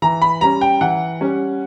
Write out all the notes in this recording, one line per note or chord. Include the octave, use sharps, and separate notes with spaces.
E3 A#5
B5
G3 C#4 A#5
G5
E3 F#5
G3 C#4